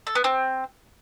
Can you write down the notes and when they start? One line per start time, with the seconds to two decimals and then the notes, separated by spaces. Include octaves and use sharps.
0.07 A4
0.15 B3
0.24 C4